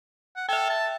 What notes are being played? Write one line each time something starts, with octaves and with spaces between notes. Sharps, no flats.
F#5
A4 E5 G5
A5